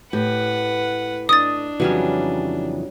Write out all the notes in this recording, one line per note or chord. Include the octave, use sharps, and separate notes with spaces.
A2 G4 B4 F#5
D4 D#5 D#6 A6
F2 C#3 E3 F#3 G3 C#4